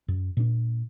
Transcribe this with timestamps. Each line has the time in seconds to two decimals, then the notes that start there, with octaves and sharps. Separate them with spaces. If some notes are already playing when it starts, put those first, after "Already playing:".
0.08 F#2
0.37 A#2 D4